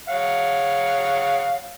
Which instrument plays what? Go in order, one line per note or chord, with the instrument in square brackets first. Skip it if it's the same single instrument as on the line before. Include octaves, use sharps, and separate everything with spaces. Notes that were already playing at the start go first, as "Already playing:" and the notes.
[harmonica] C#5 F5 F#5